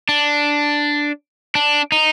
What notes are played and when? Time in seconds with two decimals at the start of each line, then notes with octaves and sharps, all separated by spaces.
0.09 D4
1.55 D4
1.92 D#4